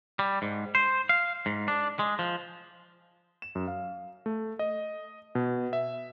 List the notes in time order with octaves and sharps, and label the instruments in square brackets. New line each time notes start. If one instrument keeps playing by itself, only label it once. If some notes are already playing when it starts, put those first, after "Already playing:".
[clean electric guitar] G3
G#2
C5
F5
G#2
D4
G#3
F3
[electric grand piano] E7
F#2
F5
A3
D#5
B2
E5